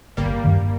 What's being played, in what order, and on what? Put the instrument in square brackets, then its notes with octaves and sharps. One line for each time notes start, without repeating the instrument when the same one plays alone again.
[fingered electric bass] G1 [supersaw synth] G3 A#3
[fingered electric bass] G2 D#3